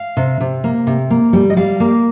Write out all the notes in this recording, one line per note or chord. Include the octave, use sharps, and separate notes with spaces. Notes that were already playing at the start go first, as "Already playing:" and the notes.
Already playing: F5
C3
C3
A#3
C3
A#3
G3
D#5
G3 F5
A#3